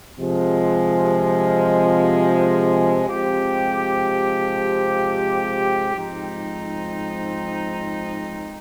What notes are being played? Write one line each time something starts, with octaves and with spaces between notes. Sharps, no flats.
C3 F3 G#3
C3 F3 G#3 C4 G4
G#2 F3 C4 D#4